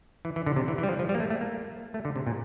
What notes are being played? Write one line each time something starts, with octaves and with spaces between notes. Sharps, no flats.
E3
E3
D3
C3
E3
E3
G3
F3
F3
G3
A#3
A3
A3
A#3
A3
D3
C3
A#2